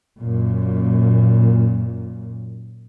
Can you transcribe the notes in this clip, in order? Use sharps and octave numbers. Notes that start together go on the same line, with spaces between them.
F#2 A#2